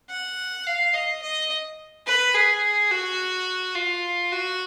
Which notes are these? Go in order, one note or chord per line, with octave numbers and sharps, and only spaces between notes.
F#5
F5
D#5
D#5
B4
G#4
F#4
F4
F#4